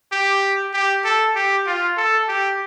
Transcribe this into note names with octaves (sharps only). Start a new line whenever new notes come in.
G4
G4
A4
G4
F4
A4
G4